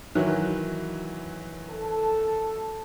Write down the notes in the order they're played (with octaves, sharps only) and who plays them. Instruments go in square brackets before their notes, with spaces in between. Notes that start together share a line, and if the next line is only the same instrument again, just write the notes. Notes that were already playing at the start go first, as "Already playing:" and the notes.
[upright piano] D#3 E3 F#3
[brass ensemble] A4 A5